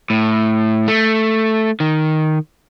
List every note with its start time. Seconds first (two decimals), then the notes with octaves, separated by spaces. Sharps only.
0.10 A2
0.88 A3
1.80 D#3